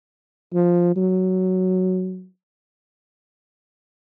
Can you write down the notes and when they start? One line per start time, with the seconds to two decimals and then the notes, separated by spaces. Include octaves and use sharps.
0.54 F3
0.96 F#3